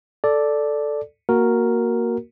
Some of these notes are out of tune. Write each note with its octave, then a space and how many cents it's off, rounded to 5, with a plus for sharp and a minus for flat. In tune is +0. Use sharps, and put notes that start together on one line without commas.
A4 +0 D5 +0
A#3 +0 F#4 +0 A#4 +0